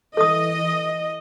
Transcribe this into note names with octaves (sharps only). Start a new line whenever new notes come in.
E3 A4 D#5 D#6